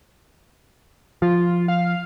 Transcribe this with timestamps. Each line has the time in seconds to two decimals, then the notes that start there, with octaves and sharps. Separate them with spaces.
1.22 F3 F4
1.68 F5